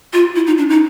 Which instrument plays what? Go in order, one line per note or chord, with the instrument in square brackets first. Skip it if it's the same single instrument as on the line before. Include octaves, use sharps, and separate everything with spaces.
[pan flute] F4
E4
D#4
D4
D#4